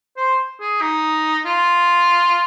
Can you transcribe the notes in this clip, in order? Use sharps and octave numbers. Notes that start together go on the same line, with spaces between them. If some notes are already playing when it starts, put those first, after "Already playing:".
C5
G#4
D#4
F4